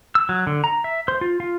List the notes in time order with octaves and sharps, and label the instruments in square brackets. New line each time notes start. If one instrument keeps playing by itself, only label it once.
[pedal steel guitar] E6
F#3
D3
A#5
E5
C5
F4
F4